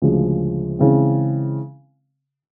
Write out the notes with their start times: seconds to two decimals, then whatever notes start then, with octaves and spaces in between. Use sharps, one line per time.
0.02 D2 C#3 F3 G#3
0.79 C#3 E3 G#3 C4